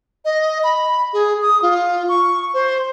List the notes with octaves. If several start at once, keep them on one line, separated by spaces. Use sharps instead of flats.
D#5
B5
G#4
D#6
F4
C#6
C5